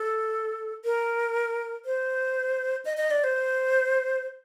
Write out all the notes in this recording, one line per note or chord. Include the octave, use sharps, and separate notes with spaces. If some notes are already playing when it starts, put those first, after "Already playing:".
Already playing: A4
A#4
C5
D#5
D#5
D5
C5